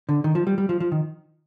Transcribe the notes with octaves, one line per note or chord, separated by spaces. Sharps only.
D3
D#3
F3
G3
G3
F3
F3
D#3